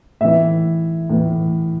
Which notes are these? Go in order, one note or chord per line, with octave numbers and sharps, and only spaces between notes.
A2 E3 E5
A2 E3